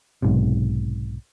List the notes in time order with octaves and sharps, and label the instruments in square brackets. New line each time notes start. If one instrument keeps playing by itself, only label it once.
[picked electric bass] B1 G#2 C3